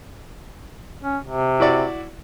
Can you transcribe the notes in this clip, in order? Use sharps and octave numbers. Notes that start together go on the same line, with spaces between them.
C#4
C3
E4 F#4 D5